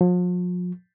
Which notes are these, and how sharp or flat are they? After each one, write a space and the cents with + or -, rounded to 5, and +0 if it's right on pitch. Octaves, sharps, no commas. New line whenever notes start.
F3 +45